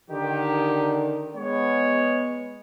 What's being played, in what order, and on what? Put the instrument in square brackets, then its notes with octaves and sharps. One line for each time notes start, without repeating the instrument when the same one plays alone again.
[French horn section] D3 D#3 [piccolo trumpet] G4
[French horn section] G#3 B3 [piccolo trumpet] C#5